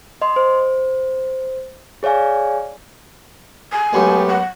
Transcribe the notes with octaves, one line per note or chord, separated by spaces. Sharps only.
D#5 C6
C5
G#4 C#5 D5 F5 G#5
G#5
F#2 F#3 G#3 A3 B3 G4
F#5